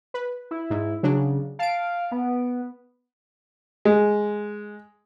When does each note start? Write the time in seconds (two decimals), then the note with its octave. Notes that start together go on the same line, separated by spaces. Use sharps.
0.14 B4
0.51 E4
0.70 G#2
1.03 C#3 F#3 D4
1.59 F5 A5 D7
2.11 B3
3.85 G#3